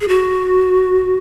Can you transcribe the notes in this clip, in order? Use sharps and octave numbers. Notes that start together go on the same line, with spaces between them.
G#4
F#4